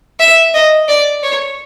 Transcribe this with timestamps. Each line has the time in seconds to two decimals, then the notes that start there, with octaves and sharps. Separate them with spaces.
0.20 E5
0.54 D#5
0.88 D5
1.23 C#5